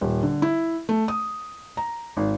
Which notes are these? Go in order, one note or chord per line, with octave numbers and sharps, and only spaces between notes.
D#1
D3
E4
A3
D#6
A#5
G#1